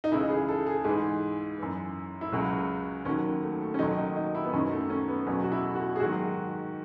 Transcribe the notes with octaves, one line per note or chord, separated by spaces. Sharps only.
D#4
C#2 C#3 E3 E4
G#4
A4
G#4
G#2 E3 G#4
F#2 E3
E4
C#2 C#3 F#3 F#4
D#2 D#3 F#3 C#4
A3
A3
C#4
D#2 D#3 F#3 D#4
D#4
D#4
E4
B3
F#2 D#3 F#3 C#4
A3
C#4
B3
E2 B2 F#3 C#4
F#4
E4
F#4
G#4
G#2 D#3 F#3 F#4